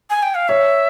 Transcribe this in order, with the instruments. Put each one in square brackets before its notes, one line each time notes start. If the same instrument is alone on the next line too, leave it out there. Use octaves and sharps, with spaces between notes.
[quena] G#5
G5
F5
[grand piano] C#5 [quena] E5